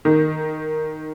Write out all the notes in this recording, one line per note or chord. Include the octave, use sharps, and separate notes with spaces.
D#3